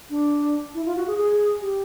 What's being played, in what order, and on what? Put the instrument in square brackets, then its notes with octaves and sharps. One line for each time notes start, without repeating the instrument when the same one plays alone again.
[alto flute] D4
E4
F4
F#4
G#4
G#4
G4